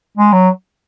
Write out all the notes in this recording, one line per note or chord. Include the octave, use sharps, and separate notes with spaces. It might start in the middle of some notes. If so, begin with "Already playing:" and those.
G#3
F#3